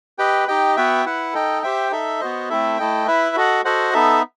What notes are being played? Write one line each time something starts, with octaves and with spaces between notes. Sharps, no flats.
G4 B4 D#5 G5
D#4 G4 D#5 G5
B3 F#4 B4 E5 G5
E4 B4 F#5
D#4 A4 D#5 G5
G4 C5 E5 G5
D#4 A4 E5
B3 F#4 C5 D#5
A3 C4 E4 A4 E5
A3 E4 A4 D#5 G5
E4 B4 E5
F#4 A4 D#5 F#5
F#4 A4 C5 D#5 F#5
B3 D#4 A4 E5